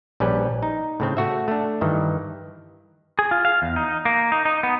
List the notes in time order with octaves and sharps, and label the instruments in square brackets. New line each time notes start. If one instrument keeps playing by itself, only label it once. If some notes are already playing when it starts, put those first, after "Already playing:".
[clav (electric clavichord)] A#1 G3 C#4 B4
D#4
A2 C#3 C4
A3 F#4 E5
A3 D4
G2 D#3 E3
[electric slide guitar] G#4
F4
F5
E2
D#4
A#3
D#4
D#4
B3